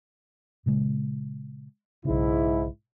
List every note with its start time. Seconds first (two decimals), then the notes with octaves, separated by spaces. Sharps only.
0.66 A#2 C#3 G#3
2.05 B1 G#2 C#3 E4